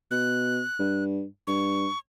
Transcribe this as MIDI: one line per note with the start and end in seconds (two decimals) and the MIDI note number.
0.11 0.62 47
0.11 1.04 90
0.79 1.24 43
1.47 1.87 43
1.47 1.98 85